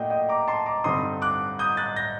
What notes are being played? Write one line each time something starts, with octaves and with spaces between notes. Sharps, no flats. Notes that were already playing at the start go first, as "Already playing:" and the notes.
Already playing: A#2 F#3 A3 D4 D#5 F#5 G5
D#5 G5
A#5 D6
A5 C6
A#5 D6
G2 D3 G3 C4 D#4 C6 D#6
D6 F#6
D#6 G6
F#6 A6
G6 A#6